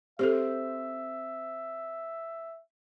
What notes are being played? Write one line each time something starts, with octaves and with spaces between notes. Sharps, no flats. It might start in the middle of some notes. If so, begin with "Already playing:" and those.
C4 G4 A4 C5 E5